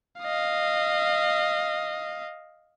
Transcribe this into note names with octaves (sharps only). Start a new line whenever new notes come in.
D#5 F5